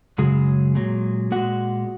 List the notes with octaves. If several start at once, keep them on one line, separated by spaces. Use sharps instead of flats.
F#2 C#3 F#3 G#3 G#4
A#2 F#3
A#2 G#3 F#4 F#5